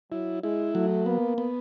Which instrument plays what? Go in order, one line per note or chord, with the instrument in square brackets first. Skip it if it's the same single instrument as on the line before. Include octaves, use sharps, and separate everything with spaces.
[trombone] F#3 [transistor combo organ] E4
[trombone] G#3 [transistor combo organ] E4
[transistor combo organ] F#3 [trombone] A3
[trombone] A#3 [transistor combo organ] B3
[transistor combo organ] B3